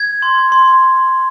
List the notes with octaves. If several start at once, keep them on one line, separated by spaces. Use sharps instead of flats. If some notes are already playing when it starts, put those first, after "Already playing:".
Already playing: G#6
C6
C6